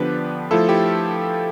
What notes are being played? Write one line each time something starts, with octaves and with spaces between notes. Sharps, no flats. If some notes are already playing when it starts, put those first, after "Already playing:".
Already playing: D3 F3 B3 D4 G4 B4
F3 A3 E4 F4 A4
E4 G4